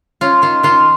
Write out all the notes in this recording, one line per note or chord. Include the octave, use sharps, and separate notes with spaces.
C#4 F4
D#3 F4
D#3 F4